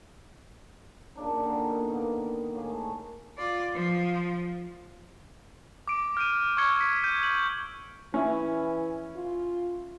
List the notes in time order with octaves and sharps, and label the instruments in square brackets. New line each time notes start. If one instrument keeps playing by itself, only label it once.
[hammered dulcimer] A#2 C#3 D4 D#4
D3 D#3 D#4
B2
A#3 B3
A2 A#3 G#4
A3
[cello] F4 D5
F3
[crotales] D6 D7
F6 G6 D7 D#7
C#6 E6 F6 G#6 C#7 G7
B6
G6 D#7
F#7
[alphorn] E3 [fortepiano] C#4 E4
[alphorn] F4